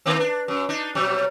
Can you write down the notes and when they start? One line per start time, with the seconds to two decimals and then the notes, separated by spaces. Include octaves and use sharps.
0.06 D#3 A#3 C4
0.20 D4
0.48 F#2
0.69 D4 D#4
0.95 B2 F#3 G3